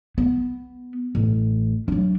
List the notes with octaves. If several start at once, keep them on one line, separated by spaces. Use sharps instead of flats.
B3
A1
F#3 D4